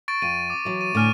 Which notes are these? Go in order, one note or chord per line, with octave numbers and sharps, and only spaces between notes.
C#6 A6 D7
F2 D#7
D6
E3 F#3
D#7
A2 D3 G#5 D6 F6 D#7